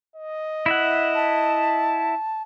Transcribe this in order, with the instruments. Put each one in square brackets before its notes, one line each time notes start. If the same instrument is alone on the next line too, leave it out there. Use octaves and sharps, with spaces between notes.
[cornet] D#5
[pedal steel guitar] E4 E5 F#5
[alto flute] A5